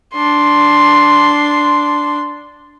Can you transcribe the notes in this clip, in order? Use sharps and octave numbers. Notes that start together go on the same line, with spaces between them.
D4 C6